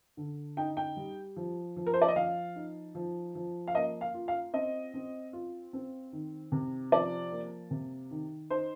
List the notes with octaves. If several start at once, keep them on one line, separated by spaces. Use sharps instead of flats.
D3
D#4 G5
G5
G3
F3
F3
A#4
C5
D5
D#5
F3 F5
D#4
F3
F3
F5
A#3 D#5
F5
F4
F5
C4 D#5
C4
F4
C4
D#3
C3
F3 D5
A#3
C3
D#3
D#4 C5